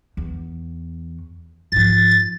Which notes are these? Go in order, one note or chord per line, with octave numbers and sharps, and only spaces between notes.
E2
G#2 F3 A6